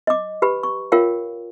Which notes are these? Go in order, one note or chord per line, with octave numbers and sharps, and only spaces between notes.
D#5 D6
G4 B4 B5
C#6
F4 A#4 C#5 F5 G5